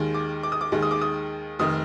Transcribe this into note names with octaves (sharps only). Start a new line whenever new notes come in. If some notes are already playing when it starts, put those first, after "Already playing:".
Already playing: D#2 D#3 G#3
D6
D6
D#6
D6
D#2 D#3 G#3
D#6
D6
D#6
F1 D#3 D#6